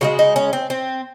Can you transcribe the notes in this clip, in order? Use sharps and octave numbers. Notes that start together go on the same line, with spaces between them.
C#3 F3 G#3 F#4
D#4
C#4
C4
C4